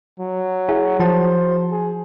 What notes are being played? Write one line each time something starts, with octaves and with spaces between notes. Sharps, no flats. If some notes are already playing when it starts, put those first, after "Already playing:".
F#3
E4 G#4
F3 F#4 C5 A5
G#4